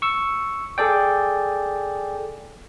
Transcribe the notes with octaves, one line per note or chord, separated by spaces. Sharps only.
C#6 E6
G#4 A4 D5 G5